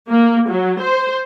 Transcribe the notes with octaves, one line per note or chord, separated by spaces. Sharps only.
A#3
F#3
C5